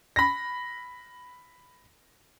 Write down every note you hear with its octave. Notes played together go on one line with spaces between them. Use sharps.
B5 A#6